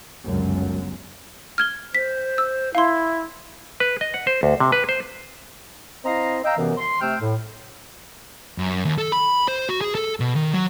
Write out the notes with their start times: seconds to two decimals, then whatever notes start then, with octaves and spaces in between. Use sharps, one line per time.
0.24 G1 C#2 F#2
1.58 F6 G#6 G7
1.95 C5 B6
2.38 E6
2.75 E4 F5 C6
3.80 B4
4.01 D#5
4.14 F#5
4.27 C5
4.43 D2
4.60 C3
4.72 B4
4.89 C5
6.05 C4 E4 D#5 F5 A#5
6.44 D#5 F5 G5 A#5 E6
6.57 F#2 C3 E3 B3 C#4
6.77 C6
7.01 C3 A3 G5 E6 F6
7.21 A2
8.58 F#2
8.85 D#2
8.98 A4
9.12 B5
9.48 C5
9.69 F#4
9.81 G#4
9.95 A4
10.20 B2
10.36 D#3
10.54 F#3